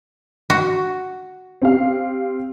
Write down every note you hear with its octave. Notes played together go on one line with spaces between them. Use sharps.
F#4
C4 G4 F5